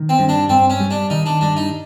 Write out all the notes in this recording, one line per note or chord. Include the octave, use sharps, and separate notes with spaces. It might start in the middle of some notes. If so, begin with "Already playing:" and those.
Already playing: D#3
C4
G2
D4
G2 C4
C#4
G3
D4
D#3 D#4
D4
G2 D4
D#4